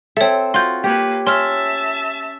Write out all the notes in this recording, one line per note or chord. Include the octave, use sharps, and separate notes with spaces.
C4 A4 C#5 E5
F4 F#4 C6 G6
A#3 G4 B4 C#5
C#4 E5 A5 C6 F6